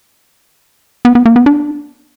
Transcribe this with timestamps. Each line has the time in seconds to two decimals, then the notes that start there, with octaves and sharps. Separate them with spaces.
1.05 B3
1.15 B3
1.25 A#3
1.36 B3
1.46 D4